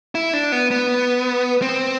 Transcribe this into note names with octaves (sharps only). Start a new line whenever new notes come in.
E4
D4
B3
B3
C4